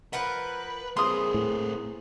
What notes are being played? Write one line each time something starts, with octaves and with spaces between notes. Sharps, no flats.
F3 A#4 B4 F#5
A#3 C4 G#4 C6 D#6
A2